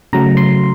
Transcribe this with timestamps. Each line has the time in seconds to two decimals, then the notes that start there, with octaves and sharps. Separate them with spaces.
0.13 C#3 F#3 A3 A#5
0.37 C6